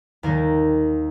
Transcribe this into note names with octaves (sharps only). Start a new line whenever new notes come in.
D#2 D#3 G3 A#4